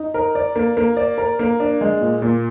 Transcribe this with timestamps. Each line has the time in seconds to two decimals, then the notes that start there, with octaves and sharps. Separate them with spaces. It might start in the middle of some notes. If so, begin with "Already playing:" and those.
Already playing: D#4
0.14 A#4
0.35 D5
0.56 A#3
0.77 A#3
0.97 D5
1.18 A#4
1.39 A#3
1.60 D4
1.81 G#3
2.01 A#2
2.22 A#2